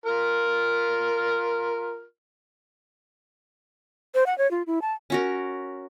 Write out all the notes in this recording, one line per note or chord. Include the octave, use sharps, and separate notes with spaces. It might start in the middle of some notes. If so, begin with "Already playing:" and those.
F4 A#4 F6
C5
F#5
C#5
F4
E4
A5
C#4 F#4 A#4